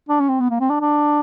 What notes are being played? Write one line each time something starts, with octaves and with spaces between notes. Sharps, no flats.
D4
C#4
C4
B3
A#3
C4
D4
D4